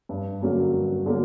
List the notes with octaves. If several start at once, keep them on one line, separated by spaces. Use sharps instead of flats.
G2
D3 F#3 A#3 C#4
G2
D3 F#3 A#3